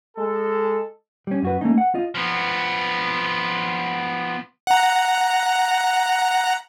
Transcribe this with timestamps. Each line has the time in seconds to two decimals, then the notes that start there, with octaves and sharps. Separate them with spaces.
0.17 G#3 A4
1.27 G3 C#4
1.42 F#2 F#4 B4
1.61 A3 A#3 C#4 D#4
1.78 F#5
1.94 F4 D#5
2.15 F3 B3
4.67 F#5 A#5